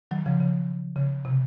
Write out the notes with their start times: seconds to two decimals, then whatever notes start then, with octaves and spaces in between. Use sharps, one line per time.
0.11 D#3 F#3
0.26 C#3 F3
0.41 C#3
0.96 C#3
1.25 C3